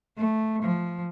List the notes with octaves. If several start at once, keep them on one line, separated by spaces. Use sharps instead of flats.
A3
F3